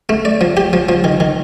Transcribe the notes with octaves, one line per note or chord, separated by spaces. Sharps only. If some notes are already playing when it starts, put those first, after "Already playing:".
A3
D5
F3
G4
F3
F3
D#3
D#3